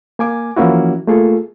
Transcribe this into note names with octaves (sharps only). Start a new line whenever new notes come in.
A#3 G#5 D6
E3 F3 A#3 C#4 E4 F#4
A3 A#3 F4 G#4 A4